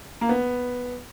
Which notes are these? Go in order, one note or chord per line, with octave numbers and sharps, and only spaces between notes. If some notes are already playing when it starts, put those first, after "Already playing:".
A#3
B3